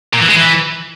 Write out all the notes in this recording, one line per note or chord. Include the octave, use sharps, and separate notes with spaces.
A#2
E3
G#3
E3